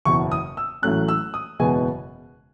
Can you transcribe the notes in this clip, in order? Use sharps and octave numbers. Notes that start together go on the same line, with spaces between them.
F#1 E2 B2 C#6
D#6
E6
A1 A2 F#3 A3 C#4 F#6
E6
D#6
F#1 E2 B2 G#3 B3 G#5